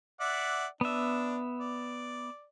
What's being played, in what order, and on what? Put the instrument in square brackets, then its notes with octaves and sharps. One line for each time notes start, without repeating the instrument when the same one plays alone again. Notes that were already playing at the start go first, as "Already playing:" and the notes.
[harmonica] D5 E5 F#5
[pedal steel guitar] B3 E5 [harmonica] D4
[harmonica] D5